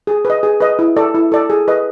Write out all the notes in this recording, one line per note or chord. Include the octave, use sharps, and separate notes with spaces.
G#4
B4
D#5
G#4
B4 D#5
E4
A4 D5
E4
A4 D5
G#4
B4 D#5